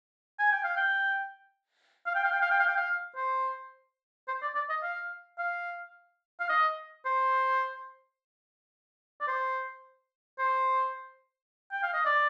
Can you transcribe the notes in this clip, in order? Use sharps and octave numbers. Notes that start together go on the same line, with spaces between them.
G#5
G5
F5
G5
F5
G5
F5
G5
F5
G5
F5
G5
F5
C5
C5
D5
D5
D#5
F5
F5
F5
D#5
C5
D5
C5
C5
G5
F5
D#5
D5